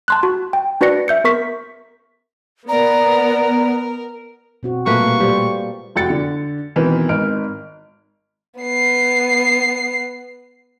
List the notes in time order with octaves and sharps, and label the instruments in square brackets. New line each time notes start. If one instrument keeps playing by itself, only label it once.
[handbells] A5 C6 F#6
F#4
G5
D4 F#4 B4 D5 A#6 C#7
E5 G6 C#7
B3 A#4 C#6 B6
[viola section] B3 [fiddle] A#4 [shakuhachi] D5 [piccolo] A#5
[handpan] B2 C4 F#4
[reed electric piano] A#2 A3 [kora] A#3 B4 [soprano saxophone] C#6
[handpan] G3 F4
[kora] G3 [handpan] G4 A4 C5
[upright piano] F1 F#4 F#5 G5 A6 C#7
D3
B2 D#3 E3 C4
G#1 D#4 F6 D7
[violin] B3 C7